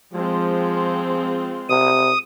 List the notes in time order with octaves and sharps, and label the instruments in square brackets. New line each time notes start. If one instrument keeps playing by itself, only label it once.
[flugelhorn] F3 [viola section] G#3 C4 F4
[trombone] C3 [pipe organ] D#6